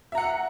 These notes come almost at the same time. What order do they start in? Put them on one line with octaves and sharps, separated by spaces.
E5 A#5 F#5